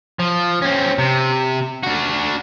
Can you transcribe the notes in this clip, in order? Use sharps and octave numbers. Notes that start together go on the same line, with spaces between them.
F3
C4 C#4
C3
D4 F#4